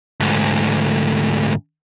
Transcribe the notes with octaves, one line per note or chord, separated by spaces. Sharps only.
D2 G#2